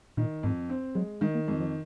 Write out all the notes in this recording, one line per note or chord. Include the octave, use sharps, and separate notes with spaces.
A#2 D#3
F2 G#2
C4
F#3 G#3
D#3 G#3
A#3
F2 G#3
F3